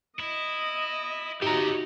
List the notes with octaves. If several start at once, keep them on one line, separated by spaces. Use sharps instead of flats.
E4 D#5
D#4 F#4 G4 C#5 E5 A#5